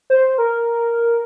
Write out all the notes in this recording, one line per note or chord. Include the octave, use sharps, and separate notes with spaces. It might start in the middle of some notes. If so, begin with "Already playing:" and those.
C5
A#4